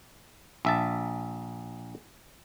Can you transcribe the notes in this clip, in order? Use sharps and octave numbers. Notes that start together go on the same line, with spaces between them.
A#1 E5 A5